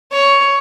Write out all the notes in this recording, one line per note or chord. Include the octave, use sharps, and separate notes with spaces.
C#5